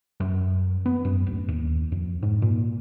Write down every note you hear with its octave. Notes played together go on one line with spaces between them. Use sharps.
F#2
B3
F#2
D1
D#2
F2
G#2
A#2